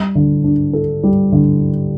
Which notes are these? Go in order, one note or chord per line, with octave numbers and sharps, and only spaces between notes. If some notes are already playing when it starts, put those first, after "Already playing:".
Already playing: G3
D3
D4
A4
G3
D3